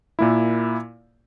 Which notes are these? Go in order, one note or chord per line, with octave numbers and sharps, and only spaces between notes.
A#2 A#3 E4